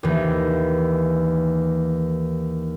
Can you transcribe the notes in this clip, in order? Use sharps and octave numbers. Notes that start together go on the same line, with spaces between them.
D#2 E3